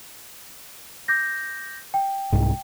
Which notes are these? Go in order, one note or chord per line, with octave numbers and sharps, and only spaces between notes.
D6 G6 A#6
G5
C2 G#2